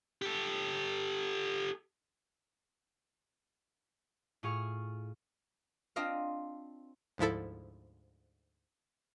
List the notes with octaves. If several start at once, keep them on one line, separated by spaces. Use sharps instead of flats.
G4 A4
A2 F4 G#4 C#6 F6
C4 D4 F4 D#5 F5
D2 G#2 F3 E4 A4